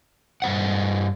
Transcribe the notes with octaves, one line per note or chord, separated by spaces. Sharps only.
G2 G#3 C5 F#5